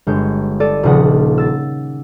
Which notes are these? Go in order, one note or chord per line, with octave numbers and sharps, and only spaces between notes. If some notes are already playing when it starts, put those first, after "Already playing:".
G1 G#3 C#5 G6
A4 D5 D#7
D#1 A#1 C#3 F#5 D#6
E6 A6